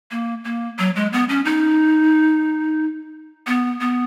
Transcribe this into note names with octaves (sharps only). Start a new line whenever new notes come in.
A#3
A#3
F#3
G#3
B3
C#4
D#4
B3
B3